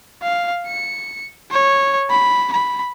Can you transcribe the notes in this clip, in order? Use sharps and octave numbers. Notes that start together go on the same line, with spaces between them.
F5
C#7
C#5
B5
B5